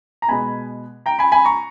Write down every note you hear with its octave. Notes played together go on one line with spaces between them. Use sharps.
A#5
B2 G#3 B3 G#5 B5
G5 A#5
G#5 B5
G#5 B5
A#5 C#6